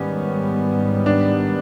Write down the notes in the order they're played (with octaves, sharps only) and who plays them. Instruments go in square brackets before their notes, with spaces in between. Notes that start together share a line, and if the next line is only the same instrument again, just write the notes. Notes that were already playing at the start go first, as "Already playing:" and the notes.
Already playing: [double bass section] G#2 D#3 G3 B3 [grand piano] C#4
[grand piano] D4